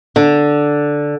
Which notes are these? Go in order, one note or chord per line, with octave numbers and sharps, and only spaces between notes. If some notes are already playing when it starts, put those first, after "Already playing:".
D3